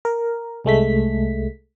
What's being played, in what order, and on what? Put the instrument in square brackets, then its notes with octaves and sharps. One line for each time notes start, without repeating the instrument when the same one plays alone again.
[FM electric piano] A#4
C2 G#3 A3 B6